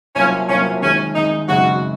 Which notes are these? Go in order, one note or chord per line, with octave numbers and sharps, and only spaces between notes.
C2 C3 F#3 A#3 C#4 F4
C2 C3 F#3 A#3 C#4 F4
D#3 G#3 C4 C#4
D#3 G#3 C4 D#4
F#2 C#3 G#3 C4 D#4 F#4